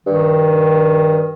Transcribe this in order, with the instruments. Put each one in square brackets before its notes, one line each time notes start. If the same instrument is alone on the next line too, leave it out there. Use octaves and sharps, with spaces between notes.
[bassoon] G2 [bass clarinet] D#3